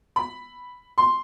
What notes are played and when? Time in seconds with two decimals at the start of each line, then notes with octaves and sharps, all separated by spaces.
0.16 B5
0.98 C6